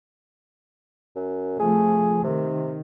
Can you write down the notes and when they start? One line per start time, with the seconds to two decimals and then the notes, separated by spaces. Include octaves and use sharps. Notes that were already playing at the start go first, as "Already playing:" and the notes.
1.16 F#2
1.59 C3 F3 A3 G#4
2.24 C3 D#3